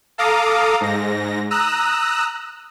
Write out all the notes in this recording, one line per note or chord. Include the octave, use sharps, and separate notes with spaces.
A4 F5 A#5 D6 D#6
G#2 A#6
A#5 D#6 E6 F#6